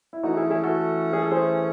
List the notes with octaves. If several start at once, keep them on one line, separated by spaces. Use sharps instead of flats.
E4
E3 A3 C#4 D#4 F#4
E4 G#4
E4 G#4
F#4 A4
G#4
A4
G#4 C5